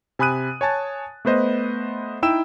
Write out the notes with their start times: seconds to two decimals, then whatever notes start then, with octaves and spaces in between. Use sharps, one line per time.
0.19 C3 G#5 B5 D#6 F#6 D#7
0.61 C#5 G#5 A5 A6
1.25 A3 B3 B4 C5 D#5
2.22 D#4 E4 G5 E6 E7